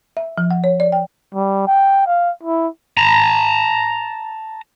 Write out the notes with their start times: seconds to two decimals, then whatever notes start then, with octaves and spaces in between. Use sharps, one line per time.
0.17 E5
0.38 F3
0.51 F#5
0.64 C#5
0.80 D5
0.92 G5
1.34 G3
1.67 G5
2.07 F5
2.43 E4
2.97 A5 A#5